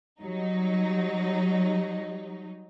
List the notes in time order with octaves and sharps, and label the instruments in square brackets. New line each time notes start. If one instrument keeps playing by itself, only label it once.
[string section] F#3 G3 D#4